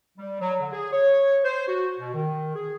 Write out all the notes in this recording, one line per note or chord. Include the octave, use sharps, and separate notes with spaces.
G3
F#3
D3
G#4
C#5
C5
F#4
B2
D#3
G#4